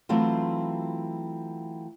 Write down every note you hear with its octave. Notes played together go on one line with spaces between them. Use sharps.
E3 F#3 A3 C4 E4 F4